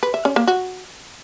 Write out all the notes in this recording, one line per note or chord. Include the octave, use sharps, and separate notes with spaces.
B4
E5
C#4
A#3
F#4